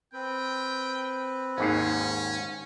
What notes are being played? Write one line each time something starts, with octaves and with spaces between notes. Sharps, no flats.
C4 B4 G5
G#1 D#2 G#2 C#4